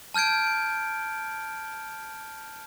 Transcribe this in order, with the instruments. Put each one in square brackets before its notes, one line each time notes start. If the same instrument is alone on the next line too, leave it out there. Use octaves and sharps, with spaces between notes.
[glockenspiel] A5 F6 G6 G#6 D7